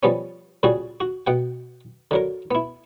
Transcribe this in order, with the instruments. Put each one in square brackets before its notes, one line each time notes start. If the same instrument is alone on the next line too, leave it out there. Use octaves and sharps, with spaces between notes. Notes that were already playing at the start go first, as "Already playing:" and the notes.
[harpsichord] F3 G3 B3 C#4
A#2 C#3 G3 F#4 G#4
F#4
B2 F#5 G5
D3 F#3 A#4
B3 E4